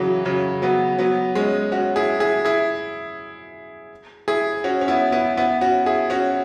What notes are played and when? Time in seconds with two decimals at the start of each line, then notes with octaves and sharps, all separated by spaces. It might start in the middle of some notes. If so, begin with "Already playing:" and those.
Already playing: C#3 E3 F#3
0.25 C#3 F#3
0.62 F#3 B3
0.98 F#3 B3
1.35 G#3 C#4
1.72 C#4 F#4
1.96 E4 G#4
2.20 E4 G#4
2.45 E4 G#4
4.28 E4 G#4
4.64 C#4 F#4
4.81 C#4
4.88 B3 E4
5.12 B3 E4
5.37 B3 E4
5.61 C#4 F#4
5.86 E4 G#4
6.10 C#4 F#4